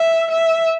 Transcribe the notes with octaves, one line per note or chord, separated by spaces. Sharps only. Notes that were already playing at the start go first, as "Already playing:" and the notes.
Already playing: E5
E5